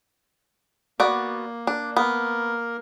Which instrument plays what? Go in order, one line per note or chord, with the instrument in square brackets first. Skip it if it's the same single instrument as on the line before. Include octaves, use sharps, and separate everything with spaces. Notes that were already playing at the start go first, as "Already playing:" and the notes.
[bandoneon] A#3 [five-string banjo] B3 F#4 D5
[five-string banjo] D4
[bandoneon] A#3 A#4 [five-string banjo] B3